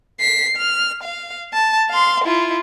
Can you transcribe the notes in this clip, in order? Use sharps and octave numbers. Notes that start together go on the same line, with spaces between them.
B6 C7
F6
F5
A5
F5 C6
E4 F4